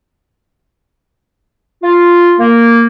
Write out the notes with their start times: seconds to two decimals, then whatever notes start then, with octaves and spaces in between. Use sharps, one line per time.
1.83 F4
2.39 A#3